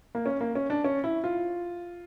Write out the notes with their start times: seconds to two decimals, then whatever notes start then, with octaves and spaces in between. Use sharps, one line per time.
0.15 A#3
0.26 C#4
0.41 A#3
0.55 C#4
0.70 D4
0.84 C#4
1.04 E4
1.24 F4